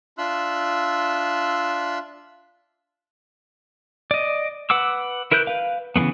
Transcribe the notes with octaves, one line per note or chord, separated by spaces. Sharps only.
D4 F4 E5 C6 E6 F#6
D5 D#5
B4 F#5 D6 E6
E4 A#4 B4 F#6 G6
B4 F5
C#3 E3 G#3 A3 B3